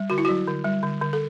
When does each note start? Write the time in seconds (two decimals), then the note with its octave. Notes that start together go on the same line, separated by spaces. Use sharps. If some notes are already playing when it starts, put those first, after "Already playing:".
Already playing: G3
0.10 D3 F#4
0.18 E4
0.25 F#3 F#4
0.47 D3
0.65 G3
0.83 D3
1.01 D3
1.13 A4